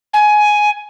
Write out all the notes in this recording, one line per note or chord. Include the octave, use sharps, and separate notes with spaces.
G#5